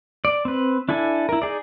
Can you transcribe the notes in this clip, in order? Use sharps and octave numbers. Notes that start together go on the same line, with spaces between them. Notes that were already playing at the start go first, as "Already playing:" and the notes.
D5
C4 B4
D4 E4 A4 G#5
E4 A#4
D#4 G#4 D5